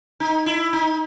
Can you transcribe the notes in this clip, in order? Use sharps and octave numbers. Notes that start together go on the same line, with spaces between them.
D#4
E4
D#4